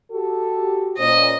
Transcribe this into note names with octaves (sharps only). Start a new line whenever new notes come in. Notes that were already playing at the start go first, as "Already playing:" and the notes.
F#4 G4 A4
A#2 C#4 C5 D#5